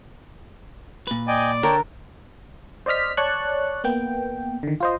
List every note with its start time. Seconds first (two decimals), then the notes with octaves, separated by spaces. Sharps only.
1.07 A#2 B4
1.28 D5 D#5 G5 G#5
1.63 D3 A#4 C#5 G5 A5
2.86 C5 D5 D#5 F6 B6
3.17 C#5 D5 A5 C#6 F#6
3.84 A#3 B3 G5
4.63 D3 D#3
4.80 F4 C5 D#5